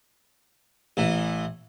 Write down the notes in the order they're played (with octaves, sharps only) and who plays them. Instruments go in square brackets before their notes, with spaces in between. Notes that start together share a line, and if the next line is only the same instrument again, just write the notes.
[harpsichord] A1 E3